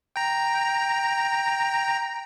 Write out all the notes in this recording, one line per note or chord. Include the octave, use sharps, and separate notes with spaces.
G5 A#5